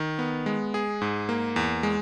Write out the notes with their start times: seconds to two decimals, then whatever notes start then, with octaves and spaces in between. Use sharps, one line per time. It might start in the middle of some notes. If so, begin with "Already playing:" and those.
Already playing: D#3
0.19 B3
0.46 G#3
0.74 G#4
1.01 G#2
1.29 A#3
1.56 E2
1.83 G#3